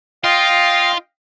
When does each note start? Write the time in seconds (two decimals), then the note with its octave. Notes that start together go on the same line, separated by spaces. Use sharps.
0.24 F4 D#5 F5 G5